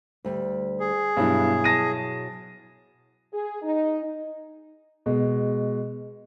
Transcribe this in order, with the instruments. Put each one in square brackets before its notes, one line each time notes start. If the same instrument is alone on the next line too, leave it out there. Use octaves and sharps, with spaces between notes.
[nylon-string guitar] D2 G3
[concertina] G#4
[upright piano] G2 [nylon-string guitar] B2 F#3 E4
[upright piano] A5 A#6 D#7
[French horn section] G#4
D#4
[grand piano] B2 G#3